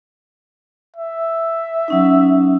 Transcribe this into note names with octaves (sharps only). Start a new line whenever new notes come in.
E5
F#3 C#4 D#4